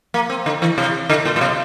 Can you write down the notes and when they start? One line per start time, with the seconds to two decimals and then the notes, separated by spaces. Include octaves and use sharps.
0.14 A#3
0.30 C4
0.46 D3
0.62 E3
0.78 C3
1.10 D3
1.25 A#2
1.36 A#2
1.41 C3